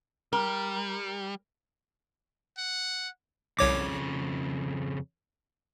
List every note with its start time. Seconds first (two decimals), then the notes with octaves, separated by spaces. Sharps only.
0.33 G3 A#4
2.58 F#5
3.59 C2 F2 C#3 C#5 D6